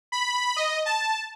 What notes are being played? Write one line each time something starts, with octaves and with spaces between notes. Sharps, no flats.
B5
D#5
A5